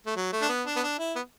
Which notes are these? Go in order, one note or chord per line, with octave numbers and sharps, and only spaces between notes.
A3
F#3
A3
D4
B3
D4
B3
D4
E4
B3